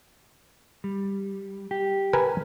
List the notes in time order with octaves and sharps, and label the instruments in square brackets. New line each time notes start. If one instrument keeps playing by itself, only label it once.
[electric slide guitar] G3
G4
[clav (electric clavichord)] A#4 B4 G#5